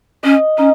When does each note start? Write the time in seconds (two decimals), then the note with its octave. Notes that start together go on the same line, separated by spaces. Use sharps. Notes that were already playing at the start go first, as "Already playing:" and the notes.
0.23 C#4 D#5
0.58 C#4 D#4